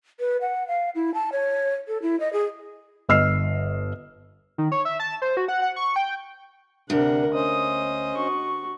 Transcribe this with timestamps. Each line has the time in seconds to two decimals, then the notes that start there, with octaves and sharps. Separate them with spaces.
0.20 B4
0.41 F#5
0.68 F5
0.95 E4
1.14 A5
1.32 C#5
1.88 A4
2.02 E4
2.20 D#5
2.33 G#4
3.09 G1 D#5 E6 F6 C7
4.58 D#3
4.72 C#5
4.85 E5
5.00 A5
5.22 C5
5.37 F#4
5.48 F#5
5.62 F#5
5.76 C#6
5.96 G5
6.90 D2 C3 D4 A#4 F#5
7.34 C#4 C5 D#5 D#6
8.16 F#4 C#6